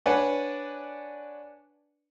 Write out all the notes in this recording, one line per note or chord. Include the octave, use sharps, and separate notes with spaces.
D4 B4 C#5 D5 F#5 G#5